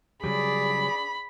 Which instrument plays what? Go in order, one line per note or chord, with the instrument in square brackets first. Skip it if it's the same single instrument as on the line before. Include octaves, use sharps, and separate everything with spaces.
[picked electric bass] C#3 F#3 G3 [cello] G#4 D5 [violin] B5